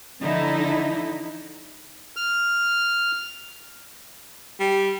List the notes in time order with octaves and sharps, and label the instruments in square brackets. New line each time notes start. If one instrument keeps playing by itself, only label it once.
[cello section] D3 E3 F3 D#4 E4
[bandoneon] F6
[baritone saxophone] G3